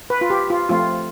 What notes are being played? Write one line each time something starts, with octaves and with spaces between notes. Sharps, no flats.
B4
F4
G4
F4
F3 A3 C4 F4